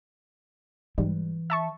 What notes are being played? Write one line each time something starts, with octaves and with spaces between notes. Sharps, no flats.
G#2 E3 G3
E5 A5 C#6